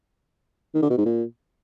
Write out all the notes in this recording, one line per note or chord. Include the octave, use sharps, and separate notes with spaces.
D#3
D3
B2
G#2
A#2